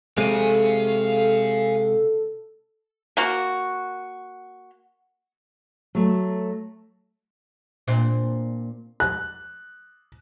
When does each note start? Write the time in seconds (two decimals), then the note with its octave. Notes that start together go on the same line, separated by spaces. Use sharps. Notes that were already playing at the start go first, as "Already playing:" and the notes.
0.18 C3 G#3 A4 F5 G#5
3.17 A#3 F#4
5.95 F#3 A3
7.88 A#2 C4 D4
9.00 F#6